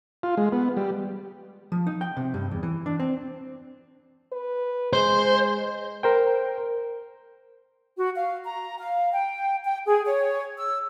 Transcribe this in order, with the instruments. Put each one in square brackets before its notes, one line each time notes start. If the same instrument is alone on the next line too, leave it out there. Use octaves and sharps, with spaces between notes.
[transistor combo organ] F4
G#3
B3
G3
[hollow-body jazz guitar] F3
D#4
G5
C3
G2
E2
E3
D4
C4
[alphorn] B4
[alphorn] G#3 [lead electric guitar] C5
[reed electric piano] A#4 C5 G5
[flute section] F#4
F5
A#5
F5
G5
G5
G#4
C#5
E6